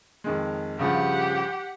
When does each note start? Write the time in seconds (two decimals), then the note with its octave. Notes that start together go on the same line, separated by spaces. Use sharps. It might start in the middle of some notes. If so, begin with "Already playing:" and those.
0.24 F2 D#3 G#3
0.79 G2 C#3 F3 G4 F#5